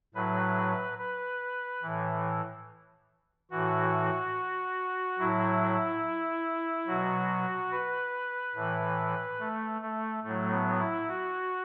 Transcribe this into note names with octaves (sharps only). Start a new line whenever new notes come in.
A2 F#3 B4
B4
A2 E3
A2 E3 F#4
A2 F#3 E4
B2 F#3 F#4
B4
A2 E3
A3
A3
A2 F#3 A3
B3
E4
F#4